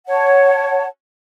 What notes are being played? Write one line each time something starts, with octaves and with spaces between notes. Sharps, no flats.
C#5 F#5 A5